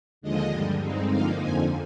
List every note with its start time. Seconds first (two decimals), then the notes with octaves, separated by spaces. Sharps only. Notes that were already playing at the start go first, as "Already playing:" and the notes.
0.21 D#2 D3 F3 G#3 D#5
0.52 G2 D3 G3
0.82 G2 D3 G#3 C4 D#4
1.11 D3 F3 A#3 D#4 F5
1.41 F2 D3 F3 G#5